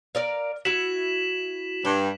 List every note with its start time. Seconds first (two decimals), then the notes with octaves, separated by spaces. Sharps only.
0.15 A#4 D5 F5
0.65 E4 F#4 B6 E7 F#7
1.85 G2 G5